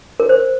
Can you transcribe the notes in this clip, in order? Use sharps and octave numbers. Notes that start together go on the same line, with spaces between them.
A#4
C5